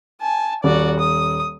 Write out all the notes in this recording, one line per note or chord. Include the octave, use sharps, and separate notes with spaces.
G#5 A5
D#1 F#4 D5
D#6